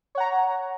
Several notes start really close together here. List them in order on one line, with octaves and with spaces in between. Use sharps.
C#5 F#5 A#5